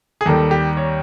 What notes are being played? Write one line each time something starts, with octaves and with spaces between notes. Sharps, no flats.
G#4
D#2 D#3 G3 A4
G4
C#5